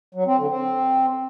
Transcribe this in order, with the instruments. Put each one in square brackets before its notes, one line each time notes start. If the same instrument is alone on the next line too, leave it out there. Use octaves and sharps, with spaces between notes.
[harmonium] F#3
C4
D3
C4